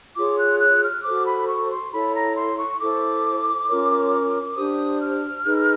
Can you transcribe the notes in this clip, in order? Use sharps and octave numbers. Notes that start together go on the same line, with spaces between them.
F4 G#4 C#5 D6
F#6
F#6
F6
F#4 A4 C5 D6
B5
C#6
C6
E4 A4 C#5 B5
A#5
C6
C#6
E4 A4 C5 D6
C#4 F4 A#4 C#5
D4 G4 C5 D#6
F6
D#4 G#4 B4